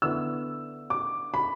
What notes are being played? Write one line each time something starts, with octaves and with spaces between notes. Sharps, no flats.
D3 B3 E4 E6
D6
B5